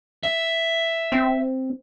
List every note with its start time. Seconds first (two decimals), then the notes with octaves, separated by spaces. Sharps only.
0.24 E5
1.12 C4